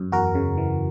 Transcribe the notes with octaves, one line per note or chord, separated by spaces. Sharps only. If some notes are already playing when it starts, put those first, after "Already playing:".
Already playing: F#2
E2 F#4 A#4
C#3
E3